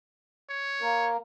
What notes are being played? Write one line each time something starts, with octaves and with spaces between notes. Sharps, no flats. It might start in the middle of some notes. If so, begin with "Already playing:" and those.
C#5
A#3 A#4